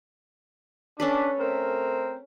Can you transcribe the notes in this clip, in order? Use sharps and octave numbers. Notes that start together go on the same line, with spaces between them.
C#4 D4 A4 B4
A3 C4 A#4